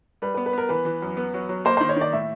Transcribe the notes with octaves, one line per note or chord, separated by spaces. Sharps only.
G3 B4
B4
B3
B4
B3 A#4
E3 B4
E3
F#2
B3
F#3
F#3
A#3 C5
D#3 C5
C#5
D#3 D5
A2 E5